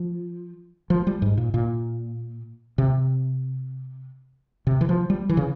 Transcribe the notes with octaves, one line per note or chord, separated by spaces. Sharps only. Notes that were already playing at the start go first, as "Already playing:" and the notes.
Already playing: F3
F3
G3
G#2
A#2
A#2
C3
C3
E3
F3
G3
E3
C#3